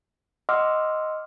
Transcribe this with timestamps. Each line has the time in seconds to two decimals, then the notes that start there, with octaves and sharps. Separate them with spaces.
0.49 D#5 F#5 C6 D6 E6 F6